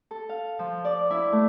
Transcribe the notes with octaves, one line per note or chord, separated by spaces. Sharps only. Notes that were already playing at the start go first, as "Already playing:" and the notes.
A4
F5
F3
D5
E4
A3